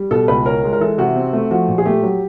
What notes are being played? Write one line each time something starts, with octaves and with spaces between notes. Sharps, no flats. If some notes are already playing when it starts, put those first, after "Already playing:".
Already playing: G3
B2 A4
C#2 B4
C#4 A#4
G#3
A#4
E3 A4
C3 F#4
C4
A3
F3 F#4
A#2
G#4
A3 G4
F#3